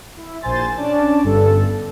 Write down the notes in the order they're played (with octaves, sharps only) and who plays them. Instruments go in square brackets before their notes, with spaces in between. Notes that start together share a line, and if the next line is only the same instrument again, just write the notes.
[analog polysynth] E4
A#1 C5 G#5 C6 A6
C#4 D4 D5 A5
G1 G2 A4